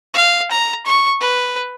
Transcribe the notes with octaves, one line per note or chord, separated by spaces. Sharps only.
F5
A#5
C#6
B4